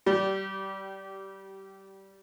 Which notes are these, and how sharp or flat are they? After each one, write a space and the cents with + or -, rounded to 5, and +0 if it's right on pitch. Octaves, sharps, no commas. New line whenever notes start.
G3 -20 G4 -30